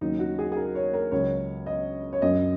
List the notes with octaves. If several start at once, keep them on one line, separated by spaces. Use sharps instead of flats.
D#2 C#3 F#3 D#4
F#4
G#4
G#4
A#4
C#5
A#4
C#2 C#3 F#3 C#4 C#5
D#5
C#5
F#2 F#3 C#4 D#5